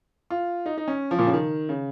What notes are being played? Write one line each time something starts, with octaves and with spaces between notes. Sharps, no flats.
F4
D#4
D#4
C#4
F3
A#2
C#3
D#3
C#3